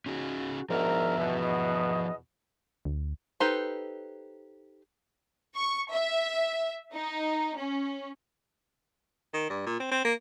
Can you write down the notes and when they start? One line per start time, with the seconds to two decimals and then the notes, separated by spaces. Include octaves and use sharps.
0.06 C#4 D#4 F#4 G#4
0.70 G#2 F3 B3 D4 F#4 A#4 E5
1.18 E2 B2
1.43 D#5
2.85 D2
3.40 D#4 G4 A4 B4 C5
5.56 C#6
5.91 E5
6.94 D#4
7.57 C#4
9.34 D#3
9.50 G2
9.66 A#2
9.80 C4
9.92 C4
10.05 A#3